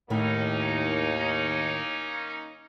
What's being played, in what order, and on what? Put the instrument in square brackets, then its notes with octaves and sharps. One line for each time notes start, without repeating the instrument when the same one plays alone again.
[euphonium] D#2 [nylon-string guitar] A2 D#3 E4 [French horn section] A#3 C#4 D#4